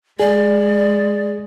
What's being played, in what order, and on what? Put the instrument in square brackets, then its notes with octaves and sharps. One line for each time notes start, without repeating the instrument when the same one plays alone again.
[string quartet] G#3 [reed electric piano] G#4 [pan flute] D5